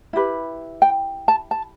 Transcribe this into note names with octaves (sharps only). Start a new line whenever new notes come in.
E4 G4 B4
G5
A5
A5